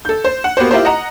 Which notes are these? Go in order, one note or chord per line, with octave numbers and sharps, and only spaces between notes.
A4 G6
C5
F#5
A#3 B3 F#4 G4 C5
E4 F4 G4 A#4 C5
D#5 F#5 A#5